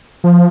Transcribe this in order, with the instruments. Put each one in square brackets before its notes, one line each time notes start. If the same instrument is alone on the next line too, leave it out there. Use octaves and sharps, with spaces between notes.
[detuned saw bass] F3